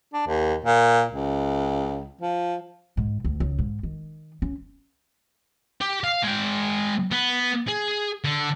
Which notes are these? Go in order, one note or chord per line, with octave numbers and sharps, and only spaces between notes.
D4
D#2
A#2
C#2
F3
G#2
D2
C#2
G#2
D#3
C#4
G4
F5
G#3 G5
B3
G#4
D3